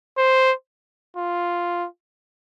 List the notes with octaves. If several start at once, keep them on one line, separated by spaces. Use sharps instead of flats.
C5
F4